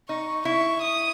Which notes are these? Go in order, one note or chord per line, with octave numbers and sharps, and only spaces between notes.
D#4 C#6
E4 C#6
D#6